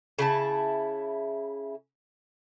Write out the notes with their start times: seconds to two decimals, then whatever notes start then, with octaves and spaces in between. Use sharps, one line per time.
0.19 C#3 E4 A5